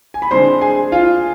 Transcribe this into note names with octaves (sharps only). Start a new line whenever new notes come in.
G#5
B5
D3 G#3 C4 C5 C6
G#4 G#5
F4 F5